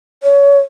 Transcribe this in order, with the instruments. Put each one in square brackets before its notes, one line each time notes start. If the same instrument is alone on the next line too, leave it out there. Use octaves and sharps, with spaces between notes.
[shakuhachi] C#5